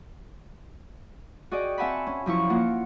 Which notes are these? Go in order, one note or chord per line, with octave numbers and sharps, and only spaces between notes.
F#4 G#4 D5 D#5 G5
C4 E5 F#5 G#5 A5 B5
C#4
F#2 F3 E4 C#6
A#3 F4 F#5